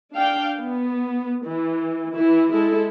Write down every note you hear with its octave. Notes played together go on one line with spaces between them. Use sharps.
D4 F5 G5
B3
E3
E3 E4
G#3 E4 A4